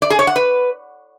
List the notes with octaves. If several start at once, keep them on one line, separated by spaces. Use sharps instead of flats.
D5
G#4
C#5
F#5
B4